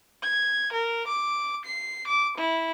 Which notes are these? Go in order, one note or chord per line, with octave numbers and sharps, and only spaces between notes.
G#6
A#4
D6
C7
D6
E4